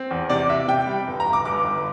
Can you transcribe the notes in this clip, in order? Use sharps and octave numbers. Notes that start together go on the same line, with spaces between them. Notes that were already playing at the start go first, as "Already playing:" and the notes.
Already playing: C4
E2
C3 D5
C3 E5
C3 G5
G3
G1
A#5
G1
D6
G1 D6
G1